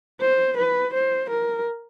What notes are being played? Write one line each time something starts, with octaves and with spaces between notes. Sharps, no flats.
C5
B4
C5
A#4